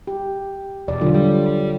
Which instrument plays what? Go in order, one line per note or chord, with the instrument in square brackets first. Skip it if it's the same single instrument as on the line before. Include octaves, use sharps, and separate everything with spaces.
[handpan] G4
[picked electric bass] E1 [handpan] D5
[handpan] D3 F#3 F4
[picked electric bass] G3